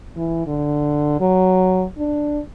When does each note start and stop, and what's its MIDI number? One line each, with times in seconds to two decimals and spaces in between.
0.16 0.44 52
0.46 1.19 50
1.20 1.85 54
1.98 2.41 62